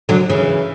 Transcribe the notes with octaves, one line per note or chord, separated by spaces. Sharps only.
D3 F#3
C#3 E3